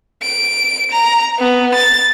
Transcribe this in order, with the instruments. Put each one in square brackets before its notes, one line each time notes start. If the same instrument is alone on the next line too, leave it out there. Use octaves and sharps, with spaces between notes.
[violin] D7
A#5
B3
A6